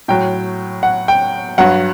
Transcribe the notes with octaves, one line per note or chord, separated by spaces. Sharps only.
A2 F#3 G5
F#5
G5
G2 F#3 F#5